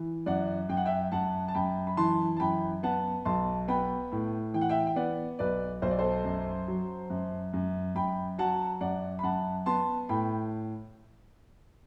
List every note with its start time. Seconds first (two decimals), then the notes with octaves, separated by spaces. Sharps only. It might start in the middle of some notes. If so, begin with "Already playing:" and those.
Already playing: E3
0.26 F#2 D5 F#5
0.69 F#2 G5
0.77 F#5
0.86 E5 G5
1.12 F#2 F#5 A5
1.48 A5
1.55 F#2 G5 B5
1.87 B5
1.97 E3 A5 C6
2.37 A5
2.40 F#2 G5 B5
2.83 B3 F#5 A5
3.25 B1 A5 C6
3.68 B3 G5 B5
4.12 A2
4.54 E3 G5
4.61 F#5
4.69 E5 G5
4.87 G5
4.96 B3 D5 F#5
5.39 B1 B4 D5
5.82 B1 C5
5.91 D5
5.99 A4 C5
6.24 F#2
6.68 F#3
7.10 F#2
7.53 F#2
7.95 F#2 G5 B5
8.38 F#3 F#5 A5
8.81 F#2 D5 F#5
9.19 B5
9.23 F#2 F#5 A5
9.66 B3 A5 C6
10.09 A2 G5 B5